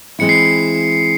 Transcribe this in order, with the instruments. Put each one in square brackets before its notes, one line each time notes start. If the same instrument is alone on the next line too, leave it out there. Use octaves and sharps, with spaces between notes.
[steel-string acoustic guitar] E3 G#3 C4 E4 [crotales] C#7
[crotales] C7